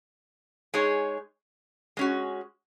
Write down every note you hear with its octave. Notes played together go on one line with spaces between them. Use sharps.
G#3 D#4 G#4 C#5
G#3 C#4 F#4